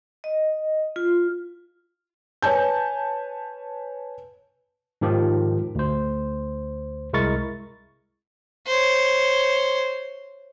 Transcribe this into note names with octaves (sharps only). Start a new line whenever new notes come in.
D#5
F4
B4 C#5 G#5 A5 G6
G#2 D#3 F3 G4
D2 C5
C2 G#3 E4 A#4 C#6 A6
C5 C#5